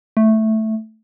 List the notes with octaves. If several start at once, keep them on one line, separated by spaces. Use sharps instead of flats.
A3